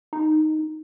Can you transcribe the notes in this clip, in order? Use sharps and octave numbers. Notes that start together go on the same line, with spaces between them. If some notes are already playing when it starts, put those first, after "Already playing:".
D#4